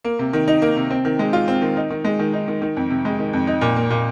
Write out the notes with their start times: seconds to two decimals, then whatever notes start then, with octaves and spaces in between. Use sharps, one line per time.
0.04 A#3
0.19 C3
0.33 D#3
0.48 D#4
0.62 A#3
0.77 C3
0.90 C4
1.05 D#3
1.19 G#3
1.33 F4
1.48 C4
1.62 D#3
1.77 D#4
1.90 D#3
2.04 G#3
2.19 D#3
2.33 D#4
2.48 D#3
2.62 D#3
2.77 F2
2.90 C3
3.05 G#3
3.19 D#3
3.33 F2
3.47 D#4
3.61 A#2
3.76 A#3
3.90 A#2